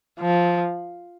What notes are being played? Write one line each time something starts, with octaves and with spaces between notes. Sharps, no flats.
F3